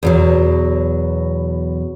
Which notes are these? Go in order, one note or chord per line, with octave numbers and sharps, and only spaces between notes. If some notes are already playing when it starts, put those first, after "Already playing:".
E2 B2 F#3